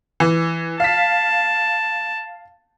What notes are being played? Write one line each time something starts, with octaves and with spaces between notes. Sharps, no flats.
E3
F5 A5 B6